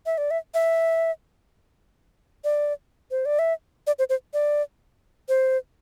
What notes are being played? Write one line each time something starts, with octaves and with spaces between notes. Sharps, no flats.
E5
D5
E5
E5
D5
C5
D5
E5
D5
C5
C5
D5
C5